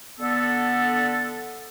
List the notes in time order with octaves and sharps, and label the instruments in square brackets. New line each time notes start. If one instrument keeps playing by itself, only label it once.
[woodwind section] D3 B3 A4